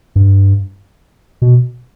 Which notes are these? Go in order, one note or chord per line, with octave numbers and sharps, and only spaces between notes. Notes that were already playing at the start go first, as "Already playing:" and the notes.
G2
B2